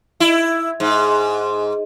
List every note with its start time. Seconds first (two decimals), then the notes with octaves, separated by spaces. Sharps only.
0.20 E4
0.80 G#2